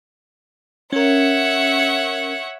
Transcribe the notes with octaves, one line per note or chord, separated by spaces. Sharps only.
C#4 A#4 C#5 E5 F#5